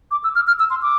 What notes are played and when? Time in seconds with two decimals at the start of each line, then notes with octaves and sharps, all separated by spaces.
0.11 D6
0.24 E6
0.35 F6
0.47 F6
0.60 E6
0.70 C6
0.82 D6